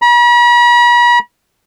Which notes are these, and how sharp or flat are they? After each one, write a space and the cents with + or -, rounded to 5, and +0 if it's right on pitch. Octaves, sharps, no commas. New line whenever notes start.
B5 -45